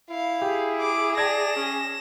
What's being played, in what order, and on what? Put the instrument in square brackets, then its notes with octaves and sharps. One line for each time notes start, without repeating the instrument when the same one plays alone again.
[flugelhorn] E4 [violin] F5
[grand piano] G4 [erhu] G#4
[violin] D6
[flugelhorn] D5 [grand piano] G5 A5 G#6 [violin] A#6 E7
[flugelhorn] C#4